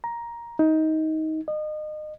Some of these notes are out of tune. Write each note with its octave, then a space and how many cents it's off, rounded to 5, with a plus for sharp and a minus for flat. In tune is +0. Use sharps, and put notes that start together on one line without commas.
A#5 +10
D#4 +20
D#5 -30